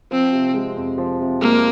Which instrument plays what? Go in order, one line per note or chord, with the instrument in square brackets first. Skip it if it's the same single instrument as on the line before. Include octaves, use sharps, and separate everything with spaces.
[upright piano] F3 [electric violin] C4
[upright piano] C3
G#3
F2
F3
C3
[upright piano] G#3 [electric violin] A#3